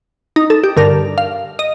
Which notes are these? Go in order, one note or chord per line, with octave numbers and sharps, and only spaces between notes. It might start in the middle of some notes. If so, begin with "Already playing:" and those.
D#4
A4
G4
G2 D3 A#4
F5
D#5